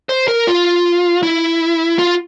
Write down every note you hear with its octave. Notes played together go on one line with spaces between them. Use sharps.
C5
A#4
F4
E4
F4